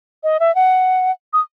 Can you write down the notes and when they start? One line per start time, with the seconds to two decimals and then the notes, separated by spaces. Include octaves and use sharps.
0.23 D#5
0.40 E5
0.55 F#5
1.33 D#6